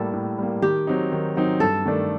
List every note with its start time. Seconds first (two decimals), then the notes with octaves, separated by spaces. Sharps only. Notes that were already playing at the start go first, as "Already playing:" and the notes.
Already playing: A2 G3 A#3 A4
0.13 A2
0.39 G3 A#3
0.62 D#3 G4
0.87 F#3 C4 D#4
1.12 D#3
1.36 F#3 C4 D#4
1.60 G2 A4
1.86 D#3 A3 D4